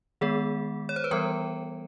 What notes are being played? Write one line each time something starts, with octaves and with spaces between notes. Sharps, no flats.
D#3 G#3 B3 G#4
C#5
C5
B4
E3 G3 B3 A#4